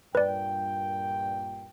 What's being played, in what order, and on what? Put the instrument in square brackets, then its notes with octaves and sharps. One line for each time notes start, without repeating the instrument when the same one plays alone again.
[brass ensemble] G2 A#2 G5 [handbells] B4 D5